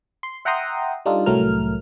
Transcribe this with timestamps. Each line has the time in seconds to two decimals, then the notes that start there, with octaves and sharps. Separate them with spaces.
0.23 C6
0.45 E5 F#5 G5 A#5 C6 D#6
1.06 G3 D4 D#4 F4 A4
1.26 C2 A2 F#3 A3 A#4 F6